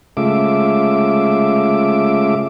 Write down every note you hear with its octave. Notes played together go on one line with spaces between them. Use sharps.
C#3 G#3 A3 F4 E5 D6